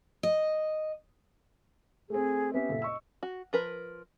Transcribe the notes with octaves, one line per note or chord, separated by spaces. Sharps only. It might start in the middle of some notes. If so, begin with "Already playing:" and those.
D#5
A3 C4 G#4
B3 C#4 G4 E5
F#1 A#2 A4
D#5 C#6 E6
F#4
F3 A#4 B4